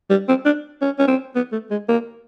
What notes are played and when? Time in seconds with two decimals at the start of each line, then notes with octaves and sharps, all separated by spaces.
0.10 G3
0.28 C4
0.45 D4
0.81 C#4
0.99 C#4
1.08 C4
1.35 B3
1.52 A3
1.71 G#3
1.89 A#3